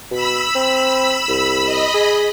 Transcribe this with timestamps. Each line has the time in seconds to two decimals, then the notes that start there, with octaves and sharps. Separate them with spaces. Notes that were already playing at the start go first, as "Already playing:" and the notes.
0.11 B2 B5 E6
0.55 C4
1.28 C2
1.64 D#5 B5
1.94 G#4